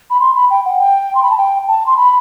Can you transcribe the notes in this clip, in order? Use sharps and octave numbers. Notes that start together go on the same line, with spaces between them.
B5
C6
B5
G5
F#5
G5
C6
B5
A5
G5
A5
C6
B5